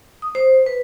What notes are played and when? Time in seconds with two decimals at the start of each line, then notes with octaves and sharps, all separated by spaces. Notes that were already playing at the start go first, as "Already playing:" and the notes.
0.22 D#6
0.35 C5
0.66 B4